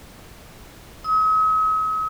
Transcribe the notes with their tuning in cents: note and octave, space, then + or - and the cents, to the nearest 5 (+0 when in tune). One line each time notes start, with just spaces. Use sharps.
D#6 +45